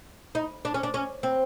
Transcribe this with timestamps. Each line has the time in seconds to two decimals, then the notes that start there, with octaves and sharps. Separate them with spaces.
0.35 D#4
0.65 D4
0.74 C#4
0.83 D4
0.94 C#4
1.23 C4